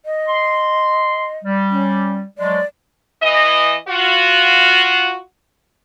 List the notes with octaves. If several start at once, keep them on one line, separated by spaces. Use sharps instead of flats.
D#5
C6
G3
C#4
F3 F#3 G#3 D5
E3 D#5
F4 F#4